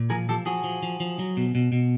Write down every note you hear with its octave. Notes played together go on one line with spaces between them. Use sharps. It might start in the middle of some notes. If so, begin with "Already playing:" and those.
Already playing: A#2
F3 G#4 A#4
F3 G4 A4
F3 F#4 G#4
F3
F3
F3
F#3
B2
B2
B2